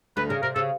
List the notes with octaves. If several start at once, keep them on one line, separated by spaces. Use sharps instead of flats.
D2 D3 B4
C#3 A#4
C3 A#4
C#3 A4